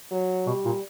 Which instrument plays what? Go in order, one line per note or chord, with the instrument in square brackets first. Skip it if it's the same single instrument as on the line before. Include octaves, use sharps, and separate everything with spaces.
[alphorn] F#3
[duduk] B2 [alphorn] G3
[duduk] A#2